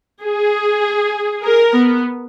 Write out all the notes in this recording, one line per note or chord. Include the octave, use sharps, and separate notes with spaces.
G#4
A#4
B3